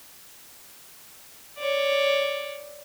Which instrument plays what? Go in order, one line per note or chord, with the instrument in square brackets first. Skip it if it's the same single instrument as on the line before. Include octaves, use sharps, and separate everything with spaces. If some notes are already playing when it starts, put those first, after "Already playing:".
[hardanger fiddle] C#5 D5